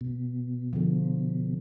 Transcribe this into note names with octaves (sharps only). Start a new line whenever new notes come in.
B2
D3 F3